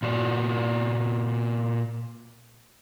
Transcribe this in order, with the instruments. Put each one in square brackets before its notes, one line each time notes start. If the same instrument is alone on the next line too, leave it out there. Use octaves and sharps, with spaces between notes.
[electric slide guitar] A#2 F#4 D5